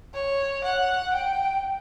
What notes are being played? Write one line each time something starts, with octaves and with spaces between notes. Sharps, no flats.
C#5
F#5
G5